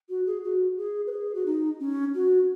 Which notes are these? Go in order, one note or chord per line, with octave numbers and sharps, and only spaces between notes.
F#4
G#4
F#4
G#4
B4
G#4
F#4
D#4
C#4
F#4